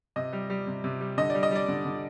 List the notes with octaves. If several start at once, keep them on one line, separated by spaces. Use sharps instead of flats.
C3 D#5
G3
G3
C3
C3
G3
D3 D#5
G3 D5
D#5
G3 D5
D3
D3